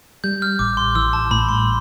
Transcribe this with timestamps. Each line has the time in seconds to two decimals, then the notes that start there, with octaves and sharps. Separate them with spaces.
0.24 G3 G6
0.42 F6
0.59 A1 D6
0.77 C6
0.95 E3 E6
1.13 A5
1.31 A2 B5
1.49 C6